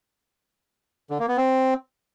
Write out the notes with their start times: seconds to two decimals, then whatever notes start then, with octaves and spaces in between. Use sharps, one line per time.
1.10 D3
1.19 A#3
1.28 B3
1.37 C4